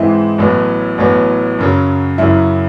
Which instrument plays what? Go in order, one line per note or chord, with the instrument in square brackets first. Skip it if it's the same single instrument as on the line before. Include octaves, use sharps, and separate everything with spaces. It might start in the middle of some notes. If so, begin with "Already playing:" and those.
Already playing: [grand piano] G#2 E3 G#3 C4 D#4 [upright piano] E4
[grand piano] A1 A2 F#3 B3
A1 A2 F#3 B3
F#2 C#3 F#3
[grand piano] F#2 C#3 F#3 [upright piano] E4